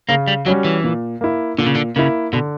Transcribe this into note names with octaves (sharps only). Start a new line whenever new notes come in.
C#3 A#3
G3
F#3 G3 C#4 F#4
E3
A#2
A#3 E4
A#2 D3
C#3
D3
C#3 A#3 E4
B2 D3